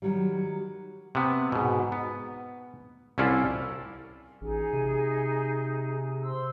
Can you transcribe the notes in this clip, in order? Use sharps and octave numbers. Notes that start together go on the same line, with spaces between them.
D#3 F#3 G3
C3 B3
G#2 B2
B3
C2 C#4 E4 F4 A4 D5
A1 D#4 G#4 G#5
C3
C5 C6 E6